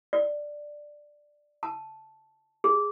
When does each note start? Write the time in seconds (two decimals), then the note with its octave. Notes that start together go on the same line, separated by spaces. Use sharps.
0.13 D5
1.63 A5
2.64 G#4